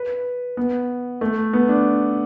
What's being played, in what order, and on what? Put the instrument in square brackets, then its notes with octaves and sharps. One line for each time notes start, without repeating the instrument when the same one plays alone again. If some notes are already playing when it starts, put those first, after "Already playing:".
Already playing: [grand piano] B4
B3
A3
B3
D4